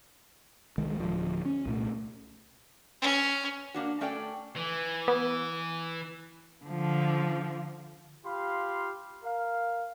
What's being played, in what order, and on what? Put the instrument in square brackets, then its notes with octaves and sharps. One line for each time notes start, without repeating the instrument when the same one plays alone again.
[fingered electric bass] C2 D#3 G#3
D1 F3
C#4
C2 A#2 A3
[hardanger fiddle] C#4
[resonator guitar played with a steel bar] A#3 D4 F#4
A3 C#4 D4 A4 D5 G5
[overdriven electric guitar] E3
[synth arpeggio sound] B3
[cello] D3 F3
[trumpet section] F4 G4 F5 B5 C6
A#4 F5